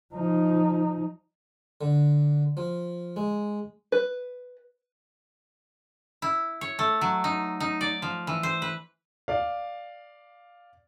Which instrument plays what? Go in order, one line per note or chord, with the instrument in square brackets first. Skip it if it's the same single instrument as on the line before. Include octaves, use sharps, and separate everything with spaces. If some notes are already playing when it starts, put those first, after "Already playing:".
[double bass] F3 D#4
[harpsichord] D3
F3
G#3
[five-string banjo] B4
[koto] E4
C#5
A3
F#3
D#4
D#4
D5
F3
E3
C5
B4
[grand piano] D5 F5